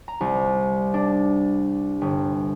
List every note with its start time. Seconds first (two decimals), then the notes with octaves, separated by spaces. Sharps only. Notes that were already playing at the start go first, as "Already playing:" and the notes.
0.08 A#5
0.21 C2
0.94 D4
2.01 G1